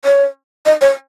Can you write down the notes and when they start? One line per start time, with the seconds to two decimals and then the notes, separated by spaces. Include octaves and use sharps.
0.05 C#5
0.66 D#5
0.81 C#5